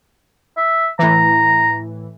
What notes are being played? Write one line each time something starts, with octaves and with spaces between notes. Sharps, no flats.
E5
A2 E3 A#5